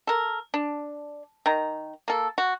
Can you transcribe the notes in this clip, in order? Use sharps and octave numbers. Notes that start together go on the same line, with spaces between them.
A4 A#4
D4
D#3 A#5
A#3 A4
F#4